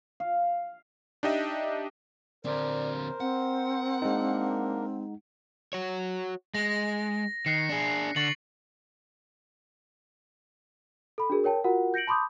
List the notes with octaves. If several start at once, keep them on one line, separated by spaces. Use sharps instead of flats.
F5
D4 D#4 G4 D#5 E5
D3 C4 A#4 C5 D5
C4 F#5
G#3 A#3 D4 D#4 A#4
F#4 C#5
G#3 A#6
D#3 F#6 C7 C#7
D4 G#4
D3 C#6 A6 F#7
A4 B5
D4 F#4 G#4 A#4
A#4 C#5 G5 A5
F4 F#4 A#4 F#5
G6 A#6 C#7 D7 F#7
A5 B5 C6 D6 D#6 G6